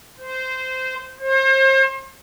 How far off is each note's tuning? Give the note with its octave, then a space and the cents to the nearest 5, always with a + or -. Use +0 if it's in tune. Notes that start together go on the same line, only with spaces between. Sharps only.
C5 -15
C5 +35